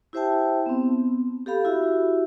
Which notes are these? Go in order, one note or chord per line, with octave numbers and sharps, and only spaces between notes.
E4 G4 C5 E5 G5 A5
B3 C4
G4 A4 F5 B5
E4 F#4 G4 E5